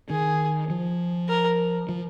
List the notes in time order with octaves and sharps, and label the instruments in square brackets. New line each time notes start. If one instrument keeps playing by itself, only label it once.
[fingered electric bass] D#3 [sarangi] G#4
[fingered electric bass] F3
[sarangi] A#4
[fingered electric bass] F3